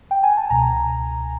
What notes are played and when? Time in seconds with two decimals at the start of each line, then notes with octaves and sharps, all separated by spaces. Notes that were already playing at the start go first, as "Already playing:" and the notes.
0.11 G5
0.23 G#5
0.37 A5
0.50 C#2 B2 G#5 A#5